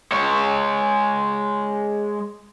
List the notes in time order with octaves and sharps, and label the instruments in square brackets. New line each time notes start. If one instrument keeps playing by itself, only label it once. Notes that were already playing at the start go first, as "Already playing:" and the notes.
[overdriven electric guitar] G#3 C#5